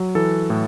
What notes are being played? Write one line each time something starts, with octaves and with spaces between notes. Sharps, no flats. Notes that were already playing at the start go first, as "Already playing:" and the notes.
Already playing: F#3
E3 A4
A2